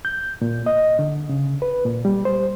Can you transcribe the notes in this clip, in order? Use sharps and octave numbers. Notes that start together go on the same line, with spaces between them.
G6
A#2
D#5
D3
C#3
B4
A#2
G3
C5